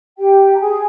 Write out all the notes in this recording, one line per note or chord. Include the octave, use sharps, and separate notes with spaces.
G4 G5
A#5
G#4 G#5